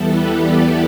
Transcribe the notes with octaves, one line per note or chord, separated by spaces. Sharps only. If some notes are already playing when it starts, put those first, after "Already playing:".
Already playing: E2 E3 G3 B3 E4 A4
G4 B4
A4 D5